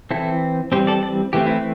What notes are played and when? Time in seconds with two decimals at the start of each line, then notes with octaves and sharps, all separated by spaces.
0.11 E3 C4 E4 A4
0.72 E3 G3 C4 G4 C5
0.87 A4 D5
1.03 A4 D5
1.33 E3 A3 C4 G4
1.46 E4